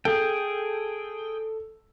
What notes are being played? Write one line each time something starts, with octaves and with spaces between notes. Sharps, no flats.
G#4 A4 G5